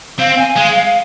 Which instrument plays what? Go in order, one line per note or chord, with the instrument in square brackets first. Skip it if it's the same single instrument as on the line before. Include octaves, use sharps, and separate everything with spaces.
[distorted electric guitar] C4 [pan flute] F5
[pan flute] G#5
[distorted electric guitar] G#3 [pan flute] F5
[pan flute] F5